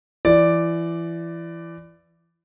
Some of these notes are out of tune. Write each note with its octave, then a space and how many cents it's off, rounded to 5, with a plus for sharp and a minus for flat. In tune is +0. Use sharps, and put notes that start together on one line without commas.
E3 +25 D5 +0